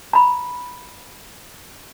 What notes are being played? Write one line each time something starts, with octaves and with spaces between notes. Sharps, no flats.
A#5 B5